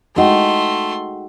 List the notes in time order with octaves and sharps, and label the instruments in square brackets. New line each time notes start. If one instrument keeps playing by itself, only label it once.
[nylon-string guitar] G#3 D#4 [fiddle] A3 C6 [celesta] F#4 F#5 G5